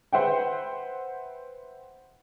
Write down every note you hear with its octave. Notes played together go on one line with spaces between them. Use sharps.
B4 C5 E5 F#5 G5